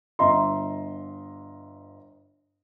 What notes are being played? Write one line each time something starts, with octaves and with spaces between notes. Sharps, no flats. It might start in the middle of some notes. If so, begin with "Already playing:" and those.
G1 D#5 E5 A#5 C6